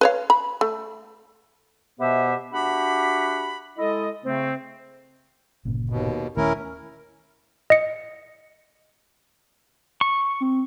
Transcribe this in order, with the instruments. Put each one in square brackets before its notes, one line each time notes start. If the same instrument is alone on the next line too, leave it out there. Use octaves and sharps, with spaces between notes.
[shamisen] B4 C#5 F5
B5
A3
[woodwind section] B2 B3 G4 C5 E5
D4 F#4 G4 E5 F#5 B5
G#3 E4 A4 D#5
C#3 A3 C4
[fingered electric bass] G1 A#2 C#3
[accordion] D#2 B2
[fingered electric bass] D#1 D#3 A3 [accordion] C#4 E4 A#4
[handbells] D#5 C#7
[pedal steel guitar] C#6
[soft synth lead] C4